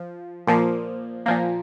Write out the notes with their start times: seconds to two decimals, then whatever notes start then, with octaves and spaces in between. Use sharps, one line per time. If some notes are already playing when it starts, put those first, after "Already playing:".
Already playing: F3
0.47 A#2 F3 A#3
1.26 A#2 F3 A#3